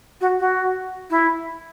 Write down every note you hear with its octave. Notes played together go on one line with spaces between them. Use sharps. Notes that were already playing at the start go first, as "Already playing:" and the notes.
F#4
F#4
E4